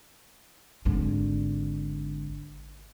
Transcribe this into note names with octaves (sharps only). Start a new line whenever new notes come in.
G#1 D3